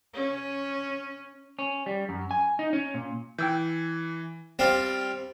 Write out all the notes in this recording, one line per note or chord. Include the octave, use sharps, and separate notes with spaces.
C#4
C#4
G3
F#2
G#5
D#4
C#4
A#2
E3 G5 E6 G6
G3 C4 F4 F5